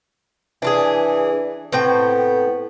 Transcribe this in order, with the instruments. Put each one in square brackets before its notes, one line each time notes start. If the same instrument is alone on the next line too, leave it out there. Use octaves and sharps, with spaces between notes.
[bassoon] E3 [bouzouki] D4 F4 G#4
[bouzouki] A2 C4 G5 [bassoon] B3